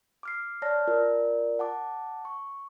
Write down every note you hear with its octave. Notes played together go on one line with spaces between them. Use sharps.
D6 F6 C7
C#5 D5 A5 F6 A#6
F4 A#4 D5
F#5 A5 D6
C#6